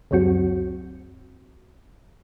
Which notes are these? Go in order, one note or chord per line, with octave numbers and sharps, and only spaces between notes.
C#2 F#2 F#3 C4 F#4